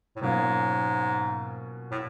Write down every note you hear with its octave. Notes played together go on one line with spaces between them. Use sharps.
A2
G#2 B2 F#3 A#3 C#4 F4
A2